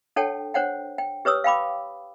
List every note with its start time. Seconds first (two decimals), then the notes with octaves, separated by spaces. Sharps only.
0.16 D4 A4 C#5 F#5 G5 A5
0.54 D4 C5 C#5 F#5 G5
0.98 G5
1.25 G4 B4 C#5 D#6 E6
1.44 F5 G5 B5 D6